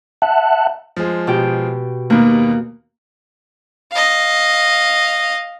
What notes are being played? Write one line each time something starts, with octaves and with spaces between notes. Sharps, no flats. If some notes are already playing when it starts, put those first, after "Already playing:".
E5 F#5 A5 F#6
F3 G#3
B2 G4 G5
D#2 B2 A#3
D#5 F5